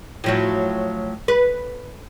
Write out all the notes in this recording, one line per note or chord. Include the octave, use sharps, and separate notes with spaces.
A2 F3 F#3
B4